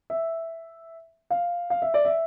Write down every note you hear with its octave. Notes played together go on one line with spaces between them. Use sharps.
E5
F5
F5
E5
D5
E5